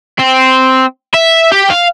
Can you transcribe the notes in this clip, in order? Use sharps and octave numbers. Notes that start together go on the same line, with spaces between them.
C4
E5
G4
F5